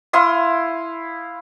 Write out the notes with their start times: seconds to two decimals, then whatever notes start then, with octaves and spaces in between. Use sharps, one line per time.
0.13 E4 F5 C6 D#6